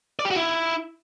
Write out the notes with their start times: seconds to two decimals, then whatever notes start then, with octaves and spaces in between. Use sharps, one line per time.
0.19 D5
0.25 G4
0.31 F#4
0.36 E4